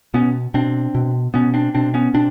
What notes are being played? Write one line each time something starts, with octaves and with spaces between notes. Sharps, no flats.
B2 B3 C#4
B2 C4 D4
B2
B2 B3 C#4
C4 D4
B2 C4 D4
B3 C#4
B2 C4 D4